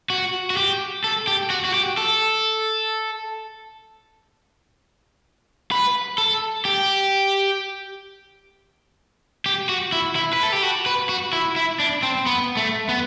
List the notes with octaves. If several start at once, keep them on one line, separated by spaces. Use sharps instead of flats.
F#4
F#4
G4
A4
G4
F#4
F#4
G4
A4
B4
A4
G4
G4
F#4
E4
E4
B4
A4
G4
F#4
B4
F#4
E4
E4
D4
C4
B3
A3
B3